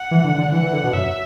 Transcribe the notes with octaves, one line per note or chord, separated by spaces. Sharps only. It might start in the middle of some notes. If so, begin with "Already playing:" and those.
Already playing: F#5
E3
D3
D3
E3 F#5
E3
D3
B2
F#2 E5